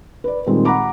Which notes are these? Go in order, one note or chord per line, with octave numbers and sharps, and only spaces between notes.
B4 D5
A#2 D#3 G3 G#3 C4
F#5 A#5 B5 D6